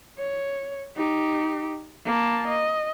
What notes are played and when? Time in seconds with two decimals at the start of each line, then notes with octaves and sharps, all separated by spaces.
0.18 C#5
0.96 D#4 G4
2.05 A#3 A5
2.47 D#5